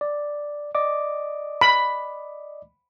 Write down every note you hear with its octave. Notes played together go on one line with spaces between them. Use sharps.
D5
D5 D#5 D6
B5